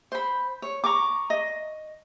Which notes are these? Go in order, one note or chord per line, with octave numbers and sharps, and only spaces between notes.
C5 B5
C#5
A#5 C#6 D6
D#5